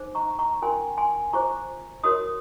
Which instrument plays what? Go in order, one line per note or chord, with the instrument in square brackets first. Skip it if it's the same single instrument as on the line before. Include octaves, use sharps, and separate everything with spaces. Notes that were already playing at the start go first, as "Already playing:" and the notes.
Already playing: [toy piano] D#4 G#4 C5
A#5 C#6
A#5 C#6
C#4 F4 A#4 G#5 C6
G#5 C6
F4 G#4 C5 A#5 C#6
F#4 A#4 C#5 C6 D#6